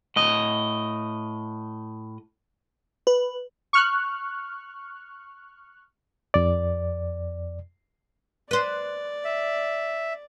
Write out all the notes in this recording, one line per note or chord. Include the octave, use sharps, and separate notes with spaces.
A2 D#5
B4
C#6 F6 F#6
F2 D5
B4 C5 D5
E5